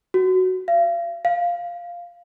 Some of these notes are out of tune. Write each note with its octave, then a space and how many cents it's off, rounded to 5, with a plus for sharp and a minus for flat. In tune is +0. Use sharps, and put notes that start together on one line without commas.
F#4 +5
F5 -40
F5 +0